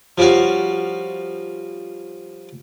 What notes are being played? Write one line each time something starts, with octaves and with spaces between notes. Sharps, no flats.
F3 G3 C#4 F#4 F5